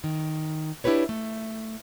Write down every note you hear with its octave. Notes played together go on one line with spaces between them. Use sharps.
D#3
D4 E4 F#4 G4 B4 C#5
A3